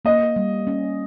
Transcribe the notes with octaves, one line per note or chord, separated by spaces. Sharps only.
A#3 D#5
G3
C#4